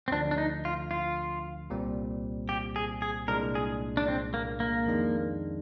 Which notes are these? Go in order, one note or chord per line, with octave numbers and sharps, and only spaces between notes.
C4
D2 D3 F3 D4
D4
D#4
F4
F4
C2 A#2 G3 C4
G4
G#4
G#4
C2 A#2 G#3 D4 A#4
G#4
D4
C4
A#3
A#3
F2 D#3 G#3 D4